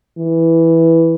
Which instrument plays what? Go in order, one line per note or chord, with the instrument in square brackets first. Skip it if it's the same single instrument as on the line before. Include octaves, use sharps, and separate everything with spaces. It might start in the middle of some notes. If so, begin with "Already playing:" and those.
[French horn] E3